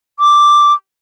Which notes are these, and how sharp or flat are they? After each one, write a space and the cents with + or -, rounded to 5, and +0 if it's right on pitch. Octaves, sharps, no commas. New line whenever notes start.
D6 +0